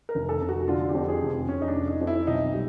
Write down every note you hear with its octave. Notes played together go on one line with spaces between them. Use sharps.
A#4
F1
A4
F1
F#4
D3 F4
G4
F2
G#4
F1
F1 C#4
D#4
D4
F2
D#4
F2
E4
B1 D#4
G3